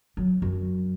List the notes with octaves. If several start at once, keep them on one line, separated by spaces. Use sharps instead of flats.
F#3
F#2